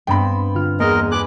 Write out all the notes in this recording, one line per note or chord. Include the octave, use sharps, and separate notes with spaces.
G2 B3 C4 G5 B5
D3 F4 F6
E2 A#3 C4 G#4 A#4 D#5 D#6
G#4 B4 D6 F#6 B6